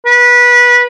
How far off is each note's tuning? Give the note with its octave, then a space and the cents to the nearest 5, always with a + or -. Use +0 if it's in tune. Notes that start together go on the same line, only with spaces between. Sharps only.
B4 -20